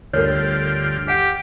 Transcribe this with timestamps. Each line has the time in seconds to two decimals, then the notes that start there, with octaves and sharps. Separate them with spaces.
0.13 D2 G2 D3 F4 G4 A4 A#4 C#5
1.08 G4 F#5